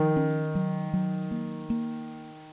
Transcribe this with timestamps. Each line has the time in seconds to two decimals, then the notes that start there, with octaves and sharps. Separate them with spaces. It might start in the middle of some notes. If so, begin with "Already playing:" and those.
Already playing: D#3 F3
0.17 C#4
0.55 F#3
0.93 F#3
1.31 A#3
1.70 A#3